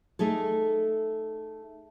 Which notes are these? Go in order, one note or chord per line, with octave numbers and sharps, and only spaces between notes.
A3 D#4 G#4 A4